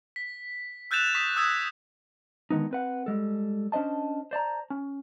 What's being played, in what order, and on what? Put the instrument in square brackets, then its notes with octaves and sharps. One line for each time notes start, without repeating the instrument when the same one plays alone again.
[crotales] B6
E6 F#6 G6 A6 E7 F7
C#6 D#6 B6
D#6 E6 F#6 G#6 A6
[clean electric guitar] D3 D#3 G#3 B3 D#4
C4 B4 F#5
G3 G#3 A4
C#4 D4 C5 D#5 A5
C5 D5 A5 A#5
C#4